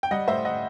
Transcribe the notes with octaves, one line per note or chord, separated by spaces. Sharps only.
G5
G3 D#5 F#5
A2 C5 E5
D#5 F#5